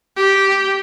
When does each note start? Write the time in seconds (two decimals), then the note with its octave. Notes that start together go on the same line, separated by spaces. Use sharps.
0.17 G4